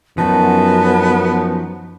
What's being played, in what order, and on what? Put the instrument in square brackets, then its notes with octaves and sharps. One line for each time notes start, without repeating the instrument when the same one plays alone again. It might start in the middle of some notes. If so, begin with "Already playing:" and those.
[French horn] F#2 [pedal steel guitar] F3 D#4 F#4 [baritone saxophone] B3 [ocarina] A5